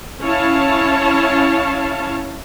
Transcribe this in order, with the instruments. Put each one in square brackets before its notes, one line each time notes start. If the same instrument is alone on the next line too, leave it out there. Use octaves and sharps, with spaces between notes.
[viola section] C#4 E4 C#5 F5 A5